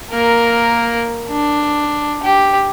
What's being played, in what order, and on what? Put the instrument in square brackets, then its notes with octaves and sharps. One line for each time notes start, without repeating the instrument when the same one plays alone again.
[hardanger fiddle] A#3 A#4
D4
G4